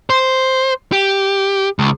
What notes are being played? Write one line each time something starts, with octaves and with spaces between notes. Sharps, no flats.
C5
G4
C#2